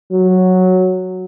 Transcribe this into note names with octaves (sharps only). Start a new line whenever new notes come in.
F#3